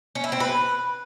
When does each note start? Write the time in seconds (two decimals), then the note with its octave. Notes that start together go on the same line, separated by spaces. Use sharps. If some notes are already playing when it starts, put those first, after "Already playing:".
0.15 C#4
0.24 E4
0.32 C4
0.40 B4